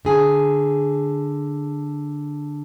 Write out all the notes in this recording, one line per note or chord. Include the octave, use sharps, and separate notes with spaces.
D3 G#4